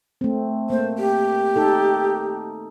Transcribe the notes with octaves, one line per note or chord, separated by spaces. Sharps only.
A3 C4
A#3 C5
G4
D#4 A4